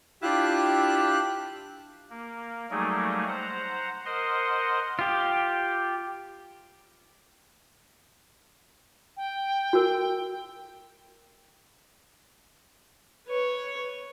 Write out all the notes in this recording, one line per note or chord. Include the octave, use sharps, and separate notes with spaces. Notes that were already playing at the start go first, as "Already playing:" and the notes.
D4 E4 F4 G4 F#6
A#3
F#3 G3 A3 A#3 D#4 G#4
C5 F#5 A#5
A#4 C5 D#5 F#5 C6
F4 G4
G5
F#4 A#4
B4 C#5